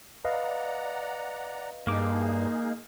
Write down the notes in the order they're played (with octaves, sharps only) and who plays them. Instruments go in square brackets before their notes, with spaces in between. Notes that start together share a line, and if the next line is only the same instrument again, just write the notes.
[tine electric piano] B4 D#5 F5 [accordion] D5 F#5 A#5
[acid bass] G2 [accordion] G#3 D#4 G#4 [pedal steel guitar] A#3 D6